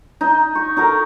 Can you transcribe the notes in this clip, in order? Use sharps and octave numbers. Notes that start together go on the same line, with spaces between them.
D#4
C#6
D#4 A4 A#4 A#5